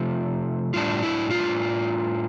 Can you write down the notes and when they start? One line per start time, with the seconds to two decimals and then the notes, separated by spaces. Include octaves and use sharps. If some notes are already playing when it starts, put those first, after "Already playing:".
Already playing: C3 F3 A3 F4
0.74 A2 G3 D4 F4
1.03 E4
1.30 F4